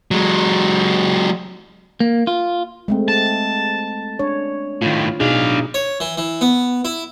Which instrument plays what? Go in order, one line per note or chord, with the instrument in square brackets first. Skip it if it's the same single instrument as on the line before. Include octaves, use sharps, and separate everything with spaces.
[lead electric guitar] F#3 G#3
[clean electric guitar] A#3
F4
[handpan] G#3 A3 C4
[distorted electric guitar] A5
[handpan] D4 C#5
[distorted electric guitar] A2 D#3 [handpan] F4
[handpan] B2 D#4 G#4 [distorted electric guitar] D4 F5
[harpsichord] C#5
E3
E3
B3
E4